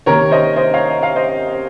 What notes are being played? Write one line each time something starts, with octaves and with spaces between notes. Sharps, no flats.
C3 D#3 A#3 A#4 C#5
C5 D#5
C5 D#5
C#5 F5
D#5
F5
C5 D#5